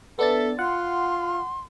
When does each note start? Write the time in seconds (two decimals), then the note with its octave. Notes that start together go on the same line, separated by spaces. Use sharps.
0.19 B3 D4 A4 E5 A6
0.59 F4 F#5 C6